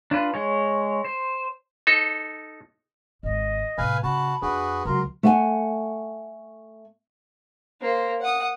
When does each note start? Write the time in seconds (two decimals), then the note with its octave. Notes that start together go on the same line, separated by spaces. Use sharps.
0.11 D4 F4 B4
0.34 G#3 C#5
1.04 C5
1.87 D#4 A4
3.23 G#1 G#2 D#5
3.78 A2 C3 B4 F5 G#5
4.03 C#3 F#4 A5 B5
4.42 F2 D4 F#4 G#4 B4
4.85 C#2 C3 F#3 F#4 A#4 C6
5.23 A3 F#5 G#5
7.81 A#3 C5
8.20 F#5 D#6